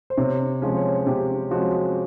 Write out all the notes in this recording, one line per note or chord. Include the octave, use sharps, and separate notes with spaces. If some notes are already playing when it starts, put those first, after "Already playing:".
C5
C3 C#5
F3 G#3 C#4
C#5
C3 G4
F3 G#3 C#4 F#4